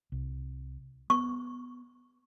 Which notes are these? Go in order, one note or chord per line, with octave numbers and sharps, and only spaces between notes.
C2
B3 C#6